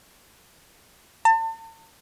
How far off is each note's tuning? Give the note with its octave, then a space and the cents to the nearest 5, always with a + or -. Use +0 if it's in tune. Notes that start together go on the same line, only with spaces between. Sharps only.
A5 +40